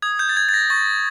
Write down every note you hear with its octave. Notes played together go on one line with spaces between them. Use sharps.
D#6 G#6
G6
A6
G6 G#6
A6
A#6
C#6 A6